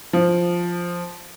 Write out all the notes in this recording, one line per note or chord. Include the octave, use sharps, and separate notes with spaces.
F3